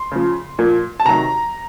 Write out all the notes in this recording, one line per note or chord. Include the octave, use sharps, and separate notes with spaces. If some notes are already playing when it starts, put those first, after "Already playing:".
Already playing: C6
C#3 F3
A#2 F3
A5
C3 D#3 F#3 A#5